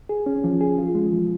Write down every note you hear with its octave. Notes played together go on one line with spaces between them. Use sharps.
G#4
C#4
F3
G#4
F4
G#3
F3